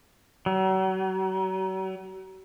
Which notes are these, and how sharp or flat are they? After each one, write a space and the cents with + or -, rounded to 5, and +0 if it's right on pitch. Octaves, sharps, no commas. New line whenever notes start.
F#3 +40